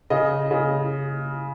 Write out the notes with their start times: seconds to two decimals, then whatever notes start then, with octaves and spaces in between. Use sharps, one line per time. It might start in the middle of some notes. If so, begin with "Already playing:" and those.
0.10 C#3 D#5
0.51 C#3